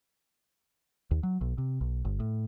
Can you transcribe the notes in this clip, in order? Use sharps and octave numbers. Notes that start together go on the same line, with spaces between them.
D#2
F#3
B1
C3
B1
G1
A2